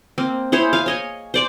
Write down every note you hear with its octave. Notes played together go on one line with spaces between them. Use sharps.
A#3 C4
E4 G#4 C5 C#5
F5 G#5
C#5 D#5 G#5
C5 D5 D6